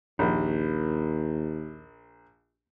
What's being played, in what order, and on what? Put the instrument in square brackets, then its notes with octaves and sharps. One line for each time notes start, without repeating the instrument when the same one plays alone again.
[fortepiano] A#1 [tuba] D#2